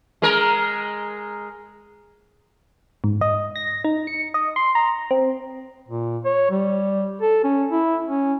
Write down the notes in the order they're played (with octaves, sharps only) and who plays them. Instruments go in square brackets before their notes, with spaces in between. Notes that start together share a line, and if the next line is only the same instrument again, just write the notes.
[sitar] G#3 A#4
[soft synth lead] G#2
D#5
A#6
D#4
C#7
D#5
C6
A#5
C4
[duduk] A#2
C#5
G3
A4
C#4
E4
C#4